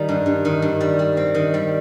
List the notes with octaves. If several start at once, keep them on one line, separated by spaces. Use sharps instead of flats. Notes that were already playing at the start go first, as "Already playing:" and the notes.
Already playing: D#3 G3
G2
G2
D#3
G2
G3
G3
C4
D#3
G3